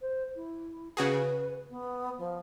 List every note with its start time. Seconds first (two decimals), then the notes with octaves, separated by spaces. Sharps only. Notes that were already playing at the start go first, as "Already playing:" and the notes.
0.02 C5
0.36 E4
0.97 C#3 F#4 G#4 B4
1.70 B3
2.18 F3